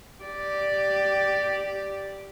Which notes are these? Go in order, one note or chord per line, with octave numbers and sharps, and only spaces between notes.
G4 D5